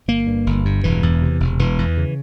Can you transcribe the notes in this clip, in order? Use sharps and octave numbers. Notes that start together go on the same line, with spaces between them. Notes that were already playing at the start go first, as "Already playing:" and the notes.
G1 A#3
G2
G1
G2
E1 E3
E2
C3
E1
E1 E3
E2
C#3